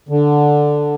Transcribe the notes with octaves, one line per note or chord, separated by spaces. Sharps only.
D3